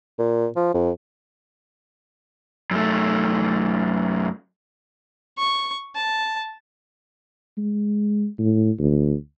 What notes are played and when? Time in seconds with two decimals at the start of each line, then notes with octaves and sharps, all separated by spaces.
0.18 A#2
0.56 F3
0.74 F2
2.71 F#2 A3
5.39 C#6
5.96 A5
7.57 G#3
8.39 A2
8.79 D2